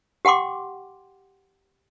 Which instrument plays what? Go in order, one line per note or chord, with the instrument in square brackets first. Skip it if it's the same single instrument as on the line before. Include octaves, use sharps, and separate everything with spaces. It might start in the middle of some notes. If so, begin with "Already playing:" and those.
[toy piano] G4 F#5 G5 C6 D6